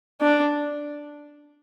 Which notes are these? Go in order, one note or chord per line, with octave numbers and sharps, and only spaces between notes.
D4